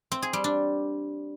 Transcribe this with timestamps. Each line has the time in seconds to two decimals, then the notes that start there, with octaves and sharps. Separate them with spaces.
0.12 C4
0.22 G#4
0.33 G3
0.44 D4